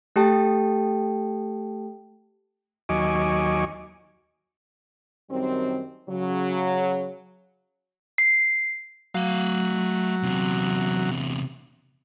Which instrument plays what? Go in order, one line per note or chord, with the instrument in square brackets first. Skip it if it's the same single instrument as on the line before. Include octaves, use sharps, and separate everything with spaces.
[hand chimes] A3 G4 A4 G5 A5
[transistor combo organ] D#2 F#3 D#5 G#5 C#6 D6
[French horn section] F#2 D#3 G3 C4
C#3 F#3
[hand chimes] C7
[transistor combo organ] F#3 [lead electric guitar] A3 F5
[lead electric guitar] E2 C3